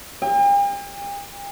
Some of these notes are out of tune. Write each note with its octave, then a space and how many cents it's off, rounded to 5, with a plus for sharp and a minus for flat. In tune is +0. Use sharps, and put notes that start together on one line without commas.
G5 +45